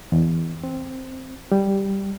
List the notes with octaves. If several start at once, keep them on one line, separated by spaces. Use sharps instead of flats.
E2
C4
G3